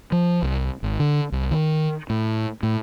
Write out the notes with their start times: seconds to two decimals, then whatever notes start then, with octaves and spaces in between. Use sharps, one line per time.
0.12 F3
0.42 C2
0.83 G#1
0.99 D3
1.32 C2
1.51 D#3
2.10 A2
2.63 A2